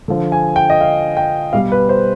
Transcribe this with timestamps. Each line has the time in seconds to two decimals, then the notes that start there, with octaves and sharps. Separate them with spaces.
0.08 D3 F3
0.32 G#5
0.56 G5
0.70 D#5
0.81 F5
1.17 G5
1.53 B2 G3 F5
1.72 B4
1.89 C5